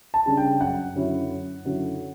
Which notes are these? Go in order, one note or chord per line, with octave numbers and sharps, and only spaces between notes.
A5
C#3 G3 D4
G5
F#2 F#5
D3 F#3 C#4 E4
F#2
D3 F#3 C#4 E4